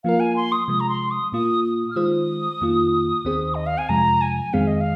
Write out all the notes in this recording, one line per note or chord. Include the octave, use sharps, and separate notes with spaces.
F3 A#3 F4 A#4 F5
G#5
C6
D#6
C3 F3 G#3 D#6
A#5
C6
D#6
A#2 A#3 F4 D#6
D#6
F6
D#3 G#3 F4 C5 D#6
F2 D#3 A#3 F4
D#2 D#3 C4 G#4 C5
D#5
F5
G#5
F2 C3 F3 G#3 A#5
G#5
F2 D#3 G#3 C4 G#4 F5
D#5
F5